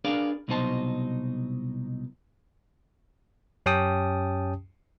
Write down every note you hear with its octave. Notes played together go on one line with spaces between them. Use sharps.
D4 G#4 A#4 B4 D5 F5
C2 B2 F#3 D#4 C5 A5
F#2 C#4 G4 G5 A5 D#6